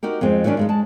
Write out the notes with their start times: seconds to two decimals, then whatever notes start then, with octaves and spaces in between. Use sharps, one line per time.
0.03 D#4 F#4 G4 A#4
0.21 F2 G#3 C4
0.44 D#3 F#3 B3 C#4 D4
0.57 G2 G#3 D#4
0.69 G#3 A5